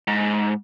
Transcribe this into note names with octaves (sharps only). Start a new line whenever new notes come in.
G#2